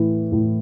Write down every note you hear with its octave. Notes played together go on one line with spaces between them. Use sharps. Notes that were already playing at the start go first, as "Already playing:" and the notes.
Already playing: A2 E3
A2 E3